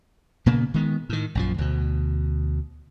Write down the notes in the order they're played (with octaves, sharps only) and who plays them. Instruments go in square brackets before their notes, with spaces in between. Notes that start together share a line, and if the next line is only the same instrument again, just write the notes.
[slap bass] A#2 C#3 A#3 B3
D#3 G#3 B3
A2 D#3
A#1 F#2 F3
D2 B2